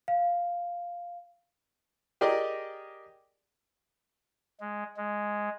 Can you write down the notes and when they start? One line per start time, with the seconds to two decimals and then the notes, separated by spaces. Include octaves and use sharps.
0.08 F5
2.21 G4 G#4 A#4 D5 D#5
4.60 G#3
4.97 G#3